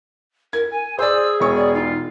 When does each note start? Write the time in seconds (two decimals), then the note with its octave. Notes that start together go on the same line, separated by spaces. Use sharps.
0.53 A#4 G#6
0.71 G#5
0.99 G#4 C5 D5 E6
1.40 E1 C#5 C#6
1.55 D5
1.74 D#4 F4